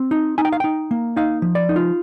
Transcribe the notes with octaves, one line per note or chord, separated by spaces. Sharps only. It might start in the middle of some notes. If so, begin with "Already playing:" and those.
Already playing: C4
D#4
D#4 G#5
G5
F5
D#4 G5
A#3
D#4 F5
F3
D5
D#4
F4